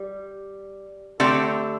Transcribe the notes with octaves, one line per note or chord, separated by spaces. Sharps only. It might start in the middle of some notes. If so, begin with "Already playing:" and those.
Already playing: G3
D3 A3 C4 G4